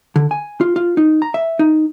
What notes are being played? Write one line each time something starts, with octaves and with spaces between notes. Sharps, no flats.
D3
G#5
F4
F4
D#4
A#5
E5
D#4